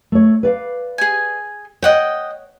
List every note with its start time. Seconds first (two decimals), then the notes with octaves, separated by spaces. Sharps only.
0.12 A3 C#5
0.43 B4 D5 F5
0.98 G#4 G#5
1.82 C#5 D#5 F#5 G5